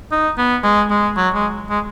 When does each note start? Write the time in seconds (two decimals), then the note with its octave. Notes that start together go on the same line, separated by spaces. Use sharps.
0.12 D#4
0.38 B3
0.63 G#3
0.90 G#3
1.17 F#3
1.34 G#3
1.70 G#3